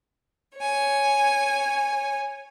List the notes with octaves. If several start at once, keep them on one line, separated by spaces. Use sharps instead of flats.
C#5 G#5